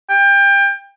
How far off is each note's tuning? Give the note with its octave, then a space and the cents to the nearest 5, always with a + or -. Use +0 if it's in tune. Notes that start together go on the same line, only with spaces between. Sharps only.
G5 +25